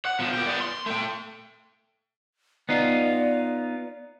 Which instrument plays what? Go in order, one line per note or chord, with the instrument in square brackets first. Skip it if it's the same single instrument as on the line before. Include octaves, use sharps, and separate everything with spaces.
[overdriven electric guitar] F#5
B2 F3
A#3 G5
B3 D5
C6
A3 G5
[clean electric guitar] B3 D#4 F4 [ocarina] D5